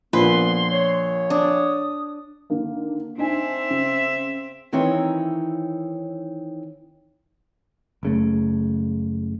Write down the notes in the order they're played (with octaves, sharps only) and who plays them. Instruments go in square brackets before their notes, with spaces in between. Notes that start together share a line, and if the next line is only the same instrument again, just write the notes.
[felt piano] A#1 [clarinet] B3 [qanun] B4 [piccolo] C6
[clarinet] C#5
[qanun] D4 [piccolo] D#6
[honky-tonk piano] D3 D#3 A#3
[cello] C4 E5 [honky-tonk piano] D4 D#4 G#5
[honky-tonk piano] C#3
[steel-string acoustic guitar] D#3 E3 C4 D#4 E4 C#5
[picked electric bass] F#1 C#3 A3